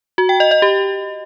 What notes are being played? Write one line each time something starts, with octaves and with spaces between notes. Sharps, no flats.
F#4
G5
D#5
D#5
G4